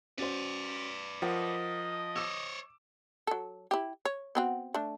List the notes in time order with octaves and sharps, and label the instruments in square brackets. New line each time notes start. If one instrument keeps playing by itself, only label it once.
[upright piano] C#4 F#4 C5 [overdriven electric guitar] B4 D5
[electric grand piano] F3 [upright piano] A#4 F#5 [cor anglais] D#5
[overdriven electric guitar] C5 C#5 [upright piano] D6 E6
[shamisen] F#3 A4
E4 G4
C#5
B3 C4 F#4
A3 D4